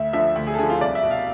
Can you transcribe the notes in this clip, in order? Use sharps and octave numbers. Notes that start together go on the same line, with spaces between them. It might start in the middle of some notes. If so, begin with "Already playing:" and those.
Already playing: D2 E5
D3 F3 E5
D2
G#4
A4
D3 F3 G#4
F4
C2 D5
E5
B2
F5